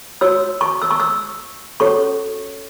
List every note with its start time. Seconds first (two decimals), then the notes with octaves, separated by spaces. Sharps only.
0.21 F#4 C#5 E6
0.61 C#6
0.82 E6
0.91 C#6
1.00 E6
1.80 C#4 F#4 A4 C#5 C#6